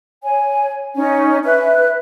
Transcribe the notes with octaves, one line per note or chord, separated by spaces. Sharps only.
C#5 G#5
C#4 D#4
B4 E5 F#6